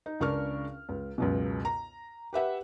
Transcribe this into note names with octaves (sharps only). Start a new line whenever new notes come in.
D#4
C#2 C#3 D4 A#4 C#6 F6
C#2
C#2 F#2 B2
A#5
G4 B4 E5 F#5